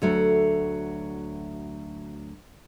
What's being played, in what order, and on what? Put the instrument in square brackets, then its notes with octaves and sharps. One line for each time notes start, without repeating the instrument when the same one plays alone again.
[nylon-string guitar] D2 F#3 A3